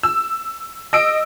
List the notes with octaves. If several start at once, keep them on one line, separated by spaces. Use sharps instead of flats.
E6
D#5 E6 D7